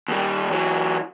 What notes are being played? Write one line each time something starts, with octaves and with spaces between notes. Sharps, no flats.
D#2 G3
E3 F#3